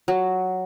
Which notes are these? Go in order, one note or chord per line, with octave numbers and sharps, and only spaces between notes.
F#3